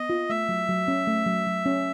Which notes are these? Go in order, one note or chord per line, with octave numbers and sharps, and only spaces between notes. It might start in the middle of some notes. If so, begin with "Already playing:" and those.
Already playing: B3 D#5
F4
A3 E5
F#3
F#3
C#4
A3
F#3
F#3
C#4